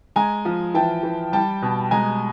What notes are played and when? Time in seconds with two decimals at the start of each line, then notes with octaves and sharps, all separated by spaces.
0.16 G#3 G#5 A#5
0.45 F3
0.74 E3 G5 A5
1.03 E3
1.33 G3 G5 A5
1.62 B2
1.91 G#3 G#5 A#5